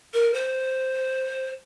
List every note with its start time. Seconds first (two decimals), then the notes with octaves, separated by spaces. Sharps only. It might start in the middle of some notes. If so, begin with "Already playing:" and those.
0.13 A#4
0.34 C5